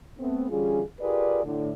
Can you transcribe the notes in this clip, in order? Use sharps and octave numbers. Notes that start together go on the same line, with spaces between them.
A3 B3 C4
D3 E3 G3 C#4 F4 G#4
F4 G4 G#4 A#4 B4 D5
A2 D3